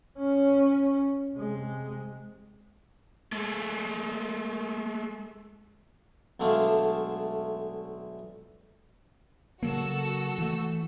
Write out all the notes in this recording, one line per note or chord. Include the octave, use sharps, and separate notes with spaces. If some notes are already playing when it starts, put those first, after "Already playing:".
C#4
C3 G#3
G#3 A3
B1 D3 G#3 A3 D4 F5
C#3 F#3 A#3 F#4 A4 E6
E3 A3